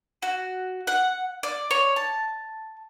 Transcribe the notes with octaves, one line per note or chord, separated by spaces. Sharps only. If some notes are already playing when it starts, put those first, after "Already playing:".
F#4
F#5
D5
C#5
A5